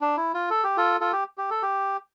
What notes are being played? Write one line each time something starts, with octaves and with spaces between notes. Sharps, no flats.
D4
E4
F4
A4
G4
F4 A4
F4 A4
G4
G4
A4
G4